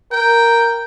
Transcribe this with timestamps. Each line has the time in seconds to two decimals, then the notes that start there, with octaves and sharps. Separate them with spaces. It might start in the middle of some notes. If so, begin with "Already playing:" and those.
0.12 A#4 G5